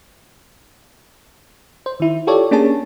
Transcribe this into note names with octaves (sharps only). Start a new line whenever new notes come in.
C5
D#3 E4
F4 G4 A4 C#5 D5
A#3 C#4 D4 G#4 C#5 A5